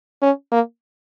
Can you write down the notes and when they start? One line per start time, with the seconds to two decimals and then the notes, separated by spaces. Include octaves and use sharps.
0.22 C#4
0.52 A#3